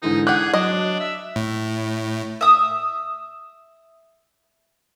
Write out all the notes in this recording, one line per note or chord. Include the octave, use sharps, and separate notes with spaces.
G#2 D3 E3 D#4
G4 G#4 F#5 F#6
F#3 D4 D#5
E5
A2
E5 D#6